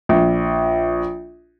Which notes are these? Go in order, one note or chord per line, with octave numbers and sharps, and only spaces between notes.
A#1